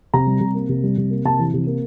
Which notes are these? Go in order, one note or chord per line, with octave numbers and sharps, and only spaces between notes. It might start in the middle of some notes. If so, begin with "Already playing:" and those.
C3 A#5
G3
C3
A#3
C3
G3
C3
A#3
C3 A5
E3
C3
A#3